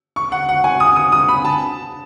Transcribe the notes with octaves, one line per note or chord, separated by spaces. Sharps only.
C#6
F#5
F#5
G#5
D#6
D#6
D#6
B5
A5